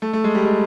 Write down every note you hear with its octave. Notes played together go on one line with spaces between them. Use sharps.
A3
A3
G#3
G3
G#3